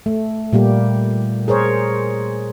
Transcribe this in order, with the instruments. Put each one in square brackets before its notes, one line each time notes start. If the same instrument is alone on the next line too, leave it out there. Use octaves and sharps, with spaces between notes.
[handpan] A3
A#2 G3 A#3 G4
G#4 A#4 C5 C#5